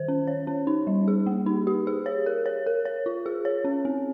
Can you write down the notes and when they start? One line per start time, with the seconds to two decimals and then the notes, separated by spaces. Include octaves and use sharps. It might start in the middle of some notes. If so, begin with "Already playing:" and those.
Already playing: D#3 C5
0.08 C#4
0.27 C#5
0.47 C#4
0.67 D#4
0.87 G3
1.08 G#4
1.26 A#3
1.46 D#4
1.67 G4
1.87 G#4
2.06 C#5
2.26 A#4
2.46 C#5
2.66 A#4
2.85 C#5
3.06 F4
3.26 G#4
3.45 C#5
3.64 C#4
3.85 C4